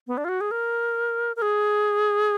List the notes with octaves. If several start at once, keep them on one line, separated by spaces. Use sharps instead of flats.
B3
D4
F4
F#4
G#4
A#4
A#4
G#4